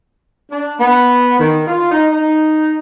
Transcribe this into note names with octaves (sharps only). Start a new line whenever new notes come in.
D4
B3
D#3
F4
D#4
D#4